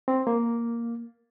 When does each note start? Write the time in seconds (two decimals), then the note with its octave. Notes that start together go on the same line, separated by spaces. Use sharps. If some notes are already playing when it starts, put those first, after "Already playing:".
0.08 C4
0.27 A#3